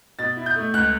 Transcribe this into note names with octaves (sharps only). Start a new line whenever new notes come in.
B2 A6
E4
G6
A3
C#2 F#6